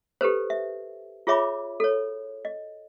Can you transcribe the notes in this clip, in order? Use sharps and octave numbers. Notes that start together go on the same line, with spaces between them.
G4 A4 B4 C5
E5
F4 G#4 C#5 E5 B5 D6
A4 C#5
D#5